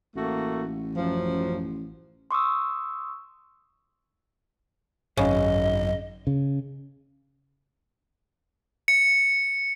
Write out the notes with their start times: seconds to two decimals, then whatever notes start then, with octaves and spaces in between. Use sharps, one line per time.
0.16 A1 A3 A#3 F#4
0.94 F#2 F3
2.31 C6 C#6 D#6 E6
5.17 G#1 F#2 C#3 D#5
6.27 C#3
8.88 C#7